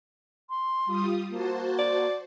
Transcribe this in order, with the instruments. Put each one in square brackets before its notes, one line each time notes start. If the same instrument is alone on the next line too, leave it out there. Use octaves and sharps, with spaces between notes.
[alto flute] C6
[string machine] G3 F4 D#6
[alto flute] A#3 [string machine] F#4 C5 A5
[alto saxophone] D5